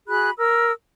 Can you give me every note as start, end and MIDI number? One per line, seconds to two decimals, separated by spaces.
0.07 0.30 66
0.07 0.30 68
0.07 0.30 83
0.07 0.30 90
0.37 0.71 70
0.37 0.71 88